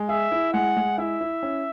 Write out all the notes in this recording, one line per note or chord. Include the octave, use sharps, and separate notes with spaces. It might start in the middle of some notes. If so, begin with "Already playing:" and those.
Already playing: G#3
G#4 E5
E4
G#3 F#5
G#3
E4 E5
E4
C#4